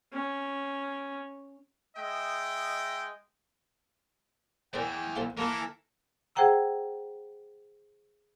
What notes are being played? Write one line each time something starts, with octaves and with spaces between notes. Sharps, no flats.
C#4
G#3 D#5 E5 G5
E2 E3 A#4 C5 D5 G5
F4 A4 C5
E3 A#3 E4 F4 A4 A#4
G#4 C5 F#5 G5 A#5 E6